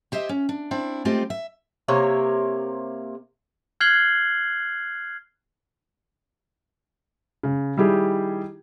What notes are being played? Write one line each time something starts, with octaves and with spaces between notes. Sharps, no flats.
G4 C5 D#5 E5
C#4
D4
C4 D4 E4
G#3 A3 C4 F4 G4
E5
C3 A#3 C#5
F6 F#6 G#6 C7 F#7 G7
C#3
D#3 G3 E4 G4 G#4